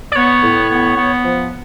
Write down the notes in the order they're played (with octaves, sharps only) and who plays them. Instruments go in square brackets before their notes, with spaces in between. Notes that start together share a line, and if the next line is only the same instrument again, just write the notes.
[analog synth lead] D5
[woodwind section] B3 [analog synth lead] C#5
[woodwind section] A2
B3
B3
F3